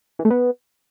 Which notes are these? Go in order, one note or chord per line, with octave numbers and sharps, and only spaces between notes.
E3
A3
B3